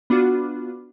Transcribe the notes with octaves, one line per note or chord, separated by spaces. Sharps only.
B3 D4 F4 F#4